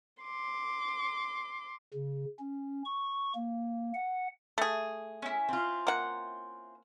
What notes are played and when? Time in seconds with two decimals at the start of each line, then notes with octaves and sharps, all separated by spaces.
0.23 C6 D6
1.94 C#3
2.39 C#4
2.85 C#6
3.35 A#3
3.94 F#5
4.58 A3 G#4
5.22 C#4 E4
5.49 C4 F4
5.87 A#3 F#5